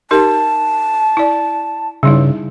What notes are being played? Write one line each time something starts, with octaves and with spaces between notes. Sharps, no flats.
D#4 G4 A#4 A5
E4 D5
G2 C#3 G3 D#4 E4